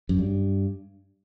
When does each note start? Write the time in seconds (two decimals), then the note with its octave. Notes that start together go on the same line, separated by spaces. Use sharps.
0.09 F#2
0.19 G2